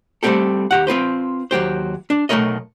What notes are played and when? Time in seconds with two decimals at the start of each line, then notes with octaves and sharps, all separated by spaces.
0.23 G3 A3 A#3 C4 G4 A4
0.71 D#2 G4 F#5
0.87 C4 F4 B4 C5
1.51 D#2 F#3 G4 C5
2.10 D4
2.29 B1 A3 B3 A#4 C#5 D#5